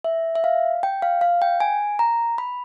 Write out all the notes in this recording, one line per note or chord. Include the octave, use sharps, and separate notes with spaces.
E5
E5
F5
G5
F5
F5
G5
G#5
A#5
B5